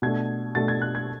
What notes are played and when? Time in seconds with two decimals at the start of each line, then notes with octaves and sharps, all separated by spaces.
0.02 B2 A3 D4 G#6
0.55 B2 A3 D4 A6
0.68 G#6
0.82 F#6
0.95 G#6